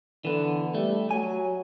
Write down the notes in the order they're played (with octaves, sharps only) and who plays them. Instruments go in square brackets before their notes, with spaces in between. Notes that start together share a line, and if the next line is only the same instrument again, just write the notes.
[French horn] D3 [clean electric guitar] E3 B3
[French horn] G3 [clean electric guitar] A3
[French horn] F#3 [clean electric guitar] G#5